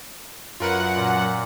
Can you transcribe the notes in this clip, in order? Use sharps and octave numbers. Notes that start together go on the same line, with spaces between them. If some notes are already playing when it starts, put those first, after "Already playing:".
F#2 F4 A#4 B4 F#5
A#2